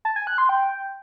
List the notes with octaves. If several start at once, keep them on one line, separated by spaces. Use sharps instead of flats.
A5
G#5
F#6
C6
G5